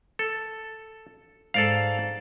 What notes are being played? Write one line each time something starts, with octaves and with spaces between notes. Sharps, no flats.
A4
G#2 A4 D5 F5